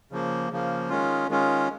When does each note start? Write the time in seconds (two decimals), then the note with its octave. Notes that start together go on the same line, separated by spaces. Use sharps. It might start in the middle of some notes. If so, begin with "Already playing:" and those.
0.12 C#3 F3 A#3
0.51 C#3 F3 A#3
0.89 D#3 G#3 C#4 F4
1.29 D#3 G#3 C#4 F4